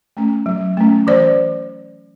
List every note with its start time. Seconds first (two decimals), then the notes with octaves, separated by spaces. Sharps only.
0.17 A3 C#4
0.46 F#3
0.77 A3 C#4
1.07 E3 C5 D5